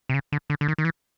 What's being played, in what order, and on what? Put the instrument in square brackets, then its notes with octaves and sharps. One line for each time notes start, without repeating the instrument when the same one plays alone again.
[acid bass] C3
C#3
D3
D3
D3
D#3
D#3
E3